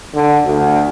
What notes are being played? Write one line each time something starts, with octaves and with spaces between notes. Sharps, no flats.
D3
D2